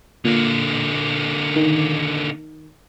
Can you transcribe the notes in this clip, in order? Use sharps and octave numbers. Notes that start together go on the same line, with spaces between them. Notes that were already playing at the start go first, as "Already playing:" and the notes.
A#2 D3 A#3
D#3